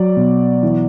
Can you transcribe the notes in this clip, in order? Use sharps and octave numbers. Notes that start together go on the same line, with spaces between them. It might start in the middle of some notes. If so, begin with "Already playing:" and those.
Already playing: F#3 D5
B2
E3